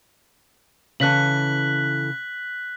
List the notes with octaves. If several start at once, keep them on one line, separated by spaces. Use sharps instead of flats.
C#3 E3 A4 F#6 B6 F#7